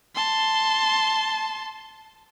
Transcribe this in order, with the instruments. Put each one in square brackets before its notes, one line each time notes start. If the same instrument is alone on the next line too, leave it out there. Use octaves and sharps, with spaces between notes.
[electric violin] A5 C6